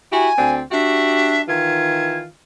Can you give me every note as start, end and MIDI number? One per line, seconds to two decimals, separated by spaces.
0.12 0.30 64
0.12 0.30 66
0.12 0.30 67
0.12 0.53 80
0.38 0.61 38
0.38 0.61 60
0.38 0.61 74
0.71 1.43 62
0.71 1.43 66
0.71 1.43 67
0.71 1.41 76
1.49 2.28 51
1.49 2.28 52
1.49 2.28 65
1.49 2.18 92